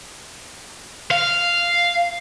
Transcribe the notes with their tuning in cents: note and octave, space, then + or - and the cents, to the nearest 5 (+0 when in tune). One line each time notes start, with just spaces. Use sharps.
F5 -5